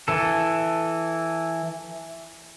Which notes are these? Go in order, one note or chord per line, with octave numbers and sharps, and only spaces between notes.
E3 A4